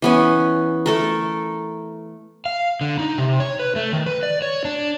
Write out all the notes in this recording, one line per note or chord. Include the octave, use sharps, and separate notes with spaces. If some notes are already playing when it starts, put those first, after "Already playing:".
E3 B3 C#4
A3 A4 A#4
F5
D3
D#4
C3
C#5
B4
A3
D#3
B4
D5
C#5
D4